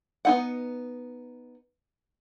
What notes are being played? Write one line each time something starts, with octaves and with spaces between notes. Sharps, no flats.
B3 D#4 F#5